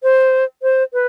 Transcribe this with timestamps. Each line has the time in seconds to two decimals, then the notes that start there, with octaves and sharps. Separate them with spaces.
0.03 C5
0.62 C5
0.93 B4